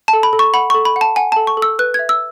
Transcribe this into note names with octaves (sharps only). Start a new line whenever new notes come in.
A5
A4
B5
A4
C#6
F#5 B5
C#6
A4
B5
F#5
A5
F#5 G#5
A5
A4
C#6
A4
E6
B4 F#6
G#6
E5
E6